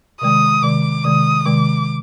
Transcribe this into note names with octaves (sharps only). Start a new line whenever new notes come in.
C3 D#3 G#3 D#6
C3 D#3 G#3 D6
C3 D#3 G#3 D#6
C3 D#3 G#3 D6